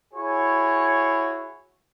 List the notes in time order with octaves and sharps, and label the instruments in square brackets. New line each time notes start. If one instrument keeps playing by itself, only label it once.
[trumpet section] E4 F#4 G#4 C#5